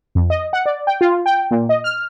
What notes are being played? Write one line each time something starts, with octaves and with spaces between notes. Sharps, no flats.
F2
D#5
F#5
D5
G5
F4
G5
A#2
D#5
F6